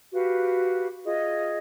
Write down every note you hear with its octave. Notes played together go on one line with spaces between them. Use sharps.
F#4 G4 B4 F5
F4 G#4 D#5